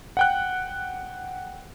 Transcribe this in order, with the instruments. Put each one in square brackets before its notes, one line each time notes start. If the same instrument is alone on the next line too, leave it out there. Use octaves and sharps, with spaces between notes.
[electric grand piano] F#5 G5 F#6